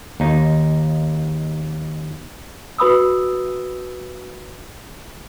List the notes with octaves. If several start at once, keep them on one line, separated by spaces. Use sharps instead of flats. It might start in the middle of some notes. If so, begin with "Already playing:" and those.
D#2 D#4
F#4 B4 B5 D#6 E6